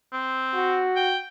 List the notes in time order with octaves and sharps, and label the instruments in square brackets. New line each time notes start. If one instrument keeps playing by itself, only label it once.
[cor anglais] C4
[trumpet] F#4
[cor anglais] G5